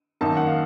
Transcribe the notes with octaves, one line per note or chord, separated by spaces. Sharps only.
F#2 D#3 A#3 D#4 A5
F#5
F5